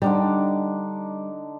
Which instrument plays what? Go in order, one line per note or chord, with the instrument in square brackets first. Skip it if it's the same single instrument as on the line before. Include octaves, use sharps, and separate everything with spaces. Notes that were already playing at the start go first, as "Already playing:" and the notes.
[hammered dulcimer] D3 D4 D#4 [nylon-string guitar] G3